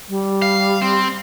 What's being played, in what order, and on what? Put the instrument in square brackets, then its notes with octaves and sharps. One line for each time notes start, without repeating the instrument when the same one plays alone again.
[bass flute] G3
[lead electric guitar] F5
C4